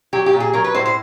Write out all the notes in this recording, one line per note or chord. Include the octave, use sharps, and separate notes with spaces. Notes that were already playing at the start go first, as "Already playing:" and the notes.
F#3 G4
G4
A#2
G#4
F#3 A#4
B4
A2 C5
C5